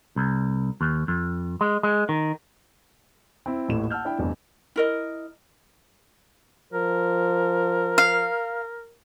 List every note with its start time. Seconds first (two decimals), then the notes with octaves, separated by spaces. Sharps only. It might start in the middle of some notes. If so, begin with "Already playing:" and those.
0.16 C2
0.81 D#2
1.08 F2
1.61 G#3
1.83 G#3
2.09 D#3
3.46 C4 E4
3.68 D#1 A1 A2 A3 E4 E7
3.90 F#5 A5 E6 F6 G6
4.05 D4 E4 G5
4.19 F1 E2 G2
4.76 E4 A#4 D#5
6.73 F3 A#4
7.98 F5